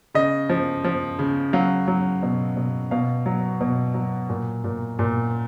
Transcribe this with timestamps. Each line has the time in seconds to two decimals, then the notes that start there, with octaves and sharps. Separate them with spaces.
0.14 C#3 D#5
0.49 F3
0.84 F3
1.19 C#3
1.53 F#3 F5
1.88 F#3
2.23 B2
2.56 B2
2.91 B2 F5
3.26 F#3
3.61 B2
3.94 F#3
4.29 A#2
4.64 A#2
4.99 A#2